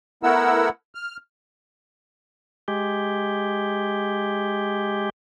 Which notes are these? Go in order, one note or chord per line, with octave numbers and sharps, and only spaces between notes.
A3 B3 E4 A#4 F#5 E6
F6
G#3 G4